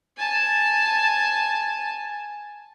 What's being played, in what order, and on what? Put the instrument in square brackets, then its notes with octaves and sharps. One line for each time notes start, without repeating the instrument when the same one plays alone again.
[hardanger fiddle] G#5 A5